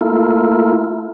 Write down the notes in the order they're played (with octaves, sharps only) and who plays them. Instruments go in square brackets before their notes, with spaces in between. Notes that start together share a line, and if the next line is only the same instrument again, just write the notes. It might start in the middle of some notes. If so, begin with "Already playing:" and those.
[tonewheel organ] A3 A#3 E4 F4